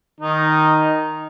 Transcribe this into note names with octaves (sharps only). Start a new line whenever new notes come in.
D#3 D#4